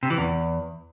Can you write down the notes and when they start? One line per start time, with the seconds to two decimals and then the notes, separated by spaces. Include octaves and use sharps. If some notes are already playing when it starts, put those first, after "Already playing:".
0.03 C3
0.10 E3
0.18 E2